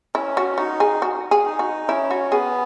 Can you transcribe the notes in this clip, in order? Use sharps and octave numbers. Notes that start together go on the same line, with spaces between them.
C#4 E4
F#4
D#4 F#4
G#4
F#4
G#4
D#4
F#4
C#4 E4
F#4
B3 G#4